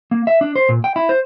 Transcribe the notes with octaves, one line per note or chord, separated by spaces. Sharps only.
A#3
E5
D4
C5
A#2
G5
E4
C5